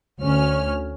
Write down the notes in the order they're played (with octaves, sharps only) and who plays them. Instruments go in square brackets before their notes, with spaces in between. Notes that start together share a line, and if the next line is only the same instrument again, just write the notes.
[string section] D2 C#4 F6